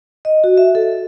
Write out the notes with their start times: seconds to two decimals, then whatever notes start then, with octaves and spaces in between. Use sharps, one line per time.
0.25 D#5
0.44 F#4
0.58 E5
0.75 A4